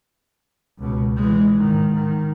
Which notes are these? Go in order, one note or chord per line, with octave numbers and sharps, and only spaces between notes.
C#2 B2
E3 G#3
G#2 D#3
D#3